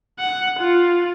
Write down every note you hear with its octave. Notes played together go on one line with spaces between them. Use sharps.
F#5
F4